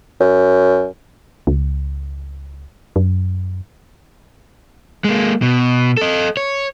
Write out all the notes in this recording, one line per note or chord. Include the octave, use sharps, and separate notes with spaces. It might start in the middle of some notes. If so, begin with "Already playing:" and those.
F#2
C#2
F#2
G#3 A#3
B2
A4 D#5
C#5